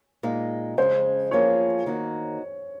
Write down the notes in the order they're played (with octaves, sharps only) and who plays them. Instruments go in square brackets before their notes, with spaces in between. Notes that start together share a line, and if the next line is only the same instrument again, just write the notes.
[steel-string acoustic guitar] A#2 G#3 D#4
[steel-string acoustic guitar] F2 C#3 G#3 C#4 [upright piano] C5
[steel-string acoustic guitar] F3 A#3 C#4 F4 G#4 [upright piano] C#5
[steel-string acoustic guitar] D#3 A#3 D#4 F#4